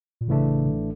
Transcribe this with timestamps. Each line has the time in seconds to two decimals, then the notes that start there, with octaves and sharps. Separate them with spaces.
0.21 A#2
0.28 A1 A2 C#3 E3 A3 D4
0.66 D3